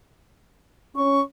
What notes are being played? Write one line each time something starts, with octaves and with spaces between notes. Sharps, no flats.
C#4 C#6